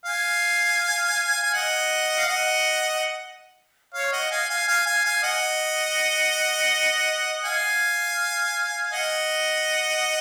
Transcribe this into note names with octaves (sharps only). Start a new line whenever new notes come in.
F5 G#5
G#5
D#5 F#5
F5
D#5 F#5
C#5 F5
D#5 F#5
F5 G#5
F5 G#5
F5 G#5
F5 G#5
F5 G#5
D#5 F#5
F5 G#5
D#5 F#5